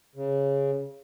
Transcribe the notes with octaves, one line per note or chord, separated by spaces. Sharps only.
C#3